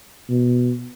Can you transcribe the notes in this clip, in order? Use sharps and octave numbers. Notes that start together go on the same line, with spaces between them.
B2